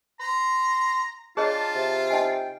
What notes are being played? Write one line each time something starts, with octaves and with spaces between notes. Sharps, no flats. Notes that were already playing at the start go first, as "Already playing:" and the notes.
A#5 C6
D4 F4 G#4 C#5 D#5 A5
C3
D#4 D#5 G5 G#5